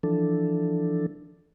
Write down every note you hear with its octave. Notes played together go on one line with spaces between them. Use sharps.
E3 F3 D4 A4